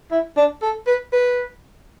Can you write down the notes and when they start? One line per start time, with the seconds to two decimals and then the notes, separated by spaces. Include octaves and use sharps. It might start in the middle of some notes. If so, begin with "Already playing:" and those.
0.11 E4
0.37 D4
0.62 A4
0.87 B4
1.12 B4